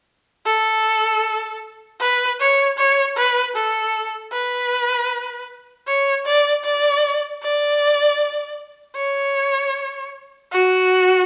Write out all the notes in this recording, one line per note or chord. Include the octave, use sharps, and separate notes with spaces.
A4
B4
C#5
C#5
B4
A4
B4
C#5
D5
D5
D5
C#5
F#4